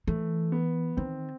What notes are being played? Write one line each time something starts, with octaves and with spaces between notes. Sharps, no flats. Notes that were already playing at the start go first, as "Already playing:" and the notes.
E3 A3
B3
D#3 C4